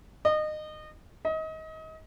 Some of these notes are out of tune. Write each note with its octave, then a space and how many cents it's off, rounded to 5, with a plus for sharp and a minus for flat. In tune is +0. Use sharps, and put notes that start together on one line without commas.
D#5 -25
D#5 +30